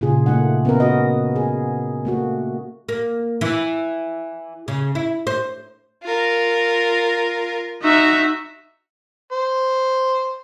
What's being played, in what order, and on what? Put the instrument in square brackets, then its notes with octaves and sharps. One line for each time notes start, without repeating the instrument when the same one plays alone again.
[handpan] A#2 C#3 F4 G#4
A3 A#3 D#4 F#5
B3 C#4 A#4
F#4 D#5
G#4
A3 A#3 F#4
[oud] A#3
E3
C#3
E4
C5
[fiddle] F4 A#4
[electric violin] D#4 E5 [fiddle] F#4
[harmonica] C5